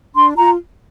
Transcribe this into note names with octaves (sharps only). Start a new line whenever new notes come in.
D4 C6
F4 A#5